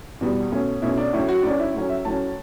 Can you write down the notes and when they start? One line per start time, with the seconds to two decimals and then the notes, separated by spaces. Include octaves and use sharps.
0.21 E2 B2 G3
0.52 B2 A3 C#4
0.82 B2 A3 C#4 E4
0.97 D4
1.13 A2 F#3 C#4 E4
1.29 F#4
1.43 A2 F#3 C#4 D4
1.60 E4
1.74 A2 F#3 C#4
1.90 E5
2.05 A2 F#3 C#4 A5